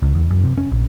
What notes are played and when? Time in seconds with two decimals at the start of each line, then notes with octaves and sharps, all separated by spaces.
0.02 C#2
0.15 E2
0.30 F#2
0.44 C3
0.58 C#4
0.71 A#1